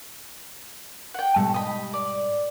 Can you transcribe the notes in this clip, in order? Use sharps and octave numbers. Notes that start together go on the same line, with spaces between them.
F#5 G5
G#2 B2 G3 A3
D#5 B5
D5